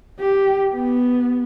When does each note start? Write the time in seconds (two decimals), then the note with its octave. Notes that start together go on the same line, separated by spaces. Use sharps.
0.20 G4
0.74 B3